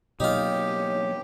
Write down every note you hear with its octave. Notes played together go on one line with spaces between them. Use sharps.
B2 F#3 A#3 D#4 F4 G4 C#5